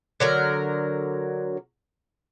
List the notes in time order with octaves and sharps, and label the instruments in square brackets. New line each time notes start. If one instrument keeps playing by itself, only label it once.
[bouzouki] D3 F#3 A#4